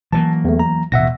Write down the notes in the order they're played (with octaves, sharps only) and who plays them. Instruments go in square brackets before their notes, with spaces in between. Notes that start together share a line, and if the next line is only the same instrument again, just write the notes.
[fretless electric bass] E3 F#3 A#3 [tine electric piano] A5
[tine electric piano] E2 A3
A#5
[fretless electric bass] D#1 A1 B2 [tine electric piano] E5 F#5 A#6